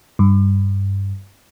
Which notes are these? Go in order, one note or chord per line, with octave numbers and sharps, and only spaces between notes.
G2